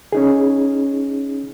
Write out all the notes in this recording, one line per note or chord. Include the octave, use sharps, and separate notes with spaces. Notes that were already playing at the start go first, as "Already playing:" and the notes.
C#4 D#4 G#4